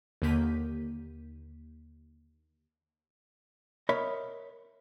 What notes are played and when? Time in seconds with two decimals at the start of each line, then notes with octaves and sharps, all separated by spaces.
0.22 D#2 D3 A#3 G6 B6 D#7
3.89 A#4 C#5 D#5 E5 B5